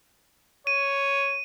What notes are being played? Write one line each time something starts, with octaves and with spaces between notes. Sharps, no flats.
C#5 D#7